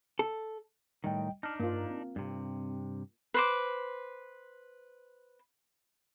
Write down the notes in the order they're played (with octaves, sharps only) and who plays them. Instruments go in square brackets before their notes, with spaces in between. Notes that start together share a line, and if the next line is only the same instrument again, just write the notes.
[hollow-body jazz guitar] A4
[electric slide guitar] A2 D#3 [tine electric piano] G3 D#5 G5
[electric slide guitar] D4 D#4 [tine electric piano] A5 F6
[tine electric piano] G2 [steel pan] A#3 F4
[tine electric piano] C4
[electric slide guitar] G2 C3
[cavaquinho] B4 C5 D6